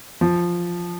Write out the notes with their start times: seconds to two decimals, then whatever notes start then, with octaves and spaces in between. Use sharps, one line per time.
0.21 F3